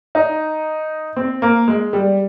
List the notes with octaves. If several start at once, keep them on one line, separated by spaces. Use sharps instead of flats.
D#4
C4
A#3
G#3
G3